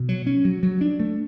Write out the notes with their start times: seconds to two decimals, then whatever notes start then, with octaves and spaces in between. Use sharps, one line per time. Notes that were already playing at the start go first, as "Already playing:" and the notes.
Already playing: B2
0.09 F#3
0.26 C#4
0.45 F#3
0.63 F#3
0.81 D4
1.00 A3